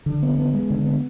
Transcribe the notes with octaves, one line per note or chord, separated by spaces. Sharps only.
D3
B3
B3
G#3
D3
B3